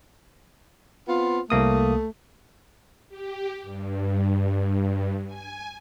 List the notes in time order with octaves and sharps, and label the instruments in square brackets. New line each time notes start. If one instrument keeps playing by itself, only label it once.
[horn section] B3 C4 F4
[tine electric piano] C2 A#3 D#6 [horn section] A3
[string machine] G4
G2
G#5